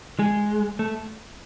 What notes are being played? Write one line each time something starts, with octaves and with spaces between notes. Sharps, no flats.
G#3
A3